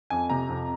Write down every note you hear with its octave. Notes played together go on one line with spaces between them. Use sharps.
F2 G#5
C3 A#5
F2